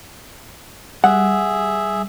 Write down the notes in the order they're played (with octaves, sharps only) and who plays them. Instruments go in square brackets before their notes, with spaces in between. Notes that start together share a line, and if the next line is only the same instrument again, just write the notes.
[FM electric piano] G3 [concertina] G#4 E5 [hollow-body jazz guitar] F#5